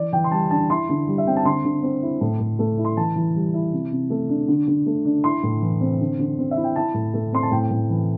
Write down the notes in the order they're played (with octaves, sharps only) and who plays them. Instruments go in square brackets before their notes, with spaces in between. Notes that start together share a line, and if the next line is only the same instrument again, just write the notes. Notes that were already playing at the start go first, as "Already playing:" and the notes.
Already playing: [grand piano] E3 D5
E3 G5
C6
G3 A5
D4 A5
E4 C6
D3
G3
E5
C4 G5
A5
D3 C6
D3
C4
E4
A2
A2
A3
E4
C6
E3 A5
E3
G3
E4
C3
C3
A3
D4
D3
D3
A3
D4
E4 C6
A2
E3
C4
D3
D3
C4
E5
E4
G5
E4 A5
A2
A3
C4 C6
A5
A2 G5
A2
E3